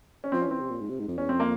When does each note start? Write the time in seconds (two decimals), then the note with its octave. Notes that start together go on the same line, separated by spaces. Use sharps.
0.24 C#4
0.32 F3 C4
0.41 C#4
0.46 E3 C4
0.60 C3
0.70 A#2
0.80 G#2
0.89 C3
0.99 G#2
1.08 F2
1.18 E2 C#4
1.29 F2 C4
1.40 A#3